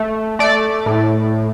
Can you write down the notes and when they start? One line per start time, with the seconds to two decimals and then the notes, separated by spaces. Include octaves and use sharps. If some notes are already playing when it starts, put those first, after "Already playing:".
Already playing: A3
0.39 A3 D5
0.86 A2